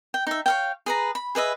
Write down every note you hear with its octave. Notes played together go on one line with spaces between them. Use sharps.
G5
D#4 E5
C#5 F5 G5
G#4 B4 A#5
B5
G#4 B4 D#5 E5